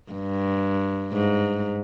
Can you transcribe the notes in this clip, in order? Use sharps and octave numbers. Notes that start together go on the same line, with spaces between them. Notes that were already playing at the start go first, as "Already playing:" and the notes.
G2
G#2